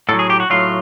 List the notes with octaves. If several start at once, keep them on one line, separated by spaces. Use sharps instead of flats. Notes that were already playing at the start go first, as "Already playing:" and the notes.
A2 F#3 A4
G#4
G4
F#4
A2 F#3 F4